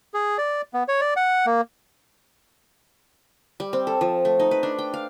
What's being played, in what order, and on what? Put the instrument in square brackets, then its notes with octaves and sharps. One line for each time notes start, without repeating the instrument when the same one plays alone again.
[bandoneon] G#4
D5
B3
C#5
D5
F#5
A#3
[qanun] G3
C4
A4
F3
A3
D#4
B4
D4
G5
F5